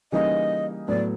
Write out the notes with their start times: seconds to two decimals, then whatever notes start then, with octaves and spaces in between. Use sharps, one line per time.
0.12 C#3 E3 G3 A#3 D#4 D#5
0.88 A2 F#3 B3 D5